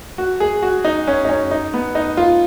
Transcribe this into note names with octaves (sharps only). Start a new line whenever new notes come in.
F#4
G#4
F#4
D#4
C#4
D#4
C#4
D#4
B3
D#4
F4